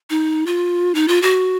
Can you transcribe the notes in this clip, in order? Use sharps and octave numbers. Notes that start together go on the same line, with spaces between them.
D#4
F4
D#4
F4
F#4